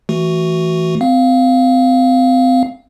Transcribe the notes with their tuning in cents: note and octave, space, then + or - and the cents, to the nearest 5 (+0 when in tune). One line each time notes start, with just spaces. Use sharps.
E3 +0 A3 +0 F#4 +5
C4 -30 F5 +0